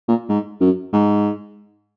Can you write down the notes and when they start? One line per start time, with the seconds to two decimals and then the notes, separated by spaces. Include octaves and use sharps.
0.08 A#2
0.29 G#2
0.61 F#2
0.93 G#2